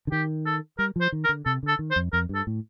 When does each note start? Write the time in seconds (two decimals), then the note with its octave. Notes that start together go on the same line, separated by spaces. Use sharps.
0.07 D3
0.12 D#3 G4
0.46 A4
0.79 G3 A#4
0.96 F3
1.01 C5
1.12 D#3
1.24 A#4
1.29 D3
1.46 C3 A4
1.63 D3 A4
1.79 D#3
1.91 C5
1.96 F2
2.13 F2 A#4
2.29 G2
2.35 A4
2.47 A2